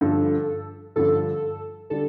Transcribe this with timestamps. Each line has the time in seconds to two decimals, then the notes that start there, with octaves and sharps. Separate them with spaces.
0.01 G2 D3 F3 A4
0.96 G2 D3 F3 A4
1.90 D3 G3 D4 A4